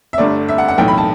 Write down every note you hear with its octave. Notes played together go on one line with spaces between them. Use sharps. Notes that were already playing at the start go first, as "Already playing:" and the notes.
E5
G1 G2 D3 A3 D5
E5
F#5
F#5
B1 A2 E3 G5
B5
A5